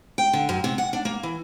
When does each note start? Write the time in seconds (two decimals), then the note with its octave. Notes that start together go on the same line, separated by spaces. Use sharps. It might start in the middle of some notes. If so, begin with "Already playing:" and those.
0.18 G5
0.33 D3
0.49 F#2
0.64 C3
0.78 F#5
0.93 D4
1.05 A#3
1.23 E3